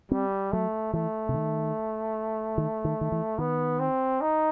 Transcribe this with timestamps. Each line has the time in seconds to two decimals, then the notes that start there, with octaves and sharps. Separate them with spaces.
0.11 G3 C4
0.52 F#3 A3
0.93 E3 A3
1.29 C3
1.34 D#3
2.58 D#3
2.85 D#3
3.01 D#3
3.12 E3
3.38 D#3 B3
3.79 C4
4.21 D#4